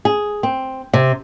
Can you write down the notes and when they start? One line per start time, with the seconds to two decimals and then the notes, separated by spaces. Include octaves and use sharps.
0.05 G#4
0.43 C4
0.93 C3